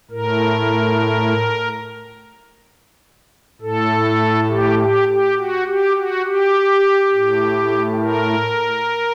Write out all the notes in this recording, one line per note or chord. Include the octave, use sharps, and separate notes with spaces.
A2 A#4
A2 A4
G4
G4
G4
F#4
G4
F#4
G4
A2
A#4